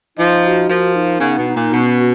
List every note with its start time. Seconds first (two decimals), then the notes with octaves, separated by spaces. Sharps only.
0.17 F3 D#4
0.42 F#4
0.68 F3 A#3
0.94 D#4
1.20 C#3 B3
1.37 B2
1.45 D#4
1.54 A#2
1.72 B2 C#4
1.97 F#4